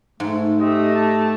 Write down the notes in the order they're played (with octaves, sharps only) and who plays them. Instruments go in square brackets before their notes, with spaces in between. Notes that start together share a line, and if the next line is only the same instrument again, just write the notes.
[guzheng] G#2 [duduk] A3
[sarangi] A3 [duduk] G4 [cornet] D#5
[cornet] A5